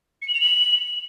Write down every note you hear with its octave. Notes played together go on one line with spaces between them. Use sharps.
C#7
F#7
F7
F#7